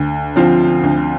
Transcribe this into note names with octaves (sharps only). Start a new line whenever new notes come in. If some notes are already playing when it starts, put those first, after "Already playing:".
Already playing: D2
D3 F3 C4 F4
D2